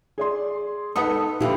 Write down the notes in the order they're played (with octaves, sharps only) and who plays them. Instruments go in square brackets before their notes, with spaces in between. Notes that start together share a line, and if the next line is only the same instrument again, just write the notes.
[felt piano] G#4 D5 C6
[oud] B3 D#4 A4 [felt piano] F#5 D#6
[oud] F2 D3 F4 [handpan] A#2 E4 G4